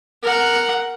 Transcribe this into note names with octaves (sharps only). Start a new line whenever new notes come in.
A#4 F#5